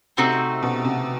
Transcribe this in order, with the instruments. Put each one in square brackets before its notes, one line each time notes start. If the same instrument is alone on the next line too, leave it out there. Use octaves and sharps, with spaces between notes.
[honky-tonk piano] C3 [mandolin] A3 C4 D#4 F#4
[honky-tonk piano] B2
C3